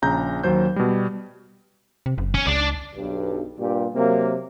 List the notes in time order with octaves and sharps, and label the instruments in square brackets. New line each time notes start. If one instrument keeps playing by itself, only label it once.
[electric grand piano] A#1 C#3 A#5 G6
D#2 F#3 C5 G6
B2 G3
[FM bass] C3
F#1
[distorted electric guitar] C#4
[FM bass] C#2 [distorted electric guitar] D4 D5
[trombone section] B1 G2
G2 A#2 G4
C3 F#3 A#3